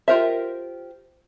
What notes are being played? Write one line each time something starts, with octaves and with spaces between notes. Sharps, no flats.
F4 G4 A#4 C5 E5